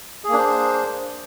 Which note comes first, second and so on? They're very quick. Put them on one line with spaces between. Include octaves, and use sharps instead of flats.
G#4 A#3 D4 C5